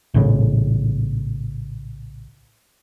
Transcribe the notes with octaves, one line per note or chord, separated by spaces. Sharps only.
A#1 A2 C#3